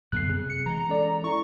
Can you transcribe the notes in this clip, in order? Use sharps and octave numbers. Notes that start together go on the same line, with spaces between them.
F#2 D3 B3 F#6 C7
C3 G#4
C#7
E3 G#3 A#5
C#4 A4 D5
E4 C#6